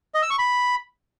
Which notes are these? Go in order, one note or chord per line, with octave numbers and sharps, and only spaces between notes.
D#5
E6
C#6
B5